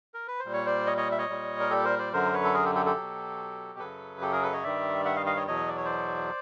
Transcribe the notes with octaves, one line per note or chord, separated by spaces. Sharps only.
A#4
B4
C5
A#2 G3
C#5
C5 D5
C#5 D#5
C#5 D#5
E5
C#5 D#5
A#2 G3
A#4
G4 A4
A#4 C5
C5 D5
F#2 D3 F#3 A#4 C5
B4 C#5
A4
G#4 A#4
G4 A4
G4 A4
G4 A4
B2 F#3
F#2 C#3 F#3 A4 B4
G4 A4
G#4 A#4
A4 B4
C#5 D#5
G2 D#3 G3 D5 E5
E5 F#5
D#5 F5
D#5 F5
C#5 D#5
E2 B2 F#3 C#5 D#5
D5
C#5
C5 D5